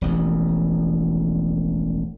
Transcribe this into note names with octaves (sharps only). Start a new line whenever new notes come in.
E1 A1 F2